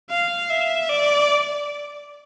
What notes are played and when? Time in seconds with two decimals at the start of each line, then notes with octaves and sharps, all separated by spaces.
0.10 F5
0.50 E5
0.89 D5